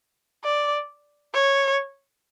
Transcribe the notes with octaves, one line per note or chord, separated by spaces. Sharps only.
D5
C#5